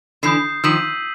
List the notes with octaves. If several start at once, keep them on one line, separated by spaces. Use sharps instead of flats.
D3 E3 D#6 G6 C7
D#3 F3 E6 G6 B6 D#7 F#7